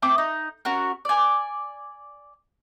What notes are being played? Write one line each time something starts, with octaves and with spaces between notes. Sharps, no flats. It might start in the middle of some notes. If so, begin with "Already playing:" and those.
A3 C4 D6
D#4
C#4 F#4 A#4
D5 G#5